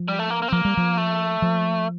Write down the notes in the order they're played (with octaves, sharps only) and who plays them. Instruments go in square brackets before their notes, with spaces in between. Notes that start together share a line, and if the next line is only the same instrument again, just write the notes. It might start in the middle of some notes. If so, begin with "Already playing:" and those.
Already playing: [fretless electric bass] F3
[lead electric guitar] G3
A3
A#3
A#3
C4
[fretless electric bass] F3 [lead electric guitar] A#3
[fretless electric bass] G3
F3
[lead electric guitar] A3
[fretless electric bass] F3